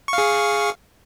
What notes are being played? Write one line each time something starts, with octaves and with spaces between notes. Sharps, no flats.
G#4 F5 C#6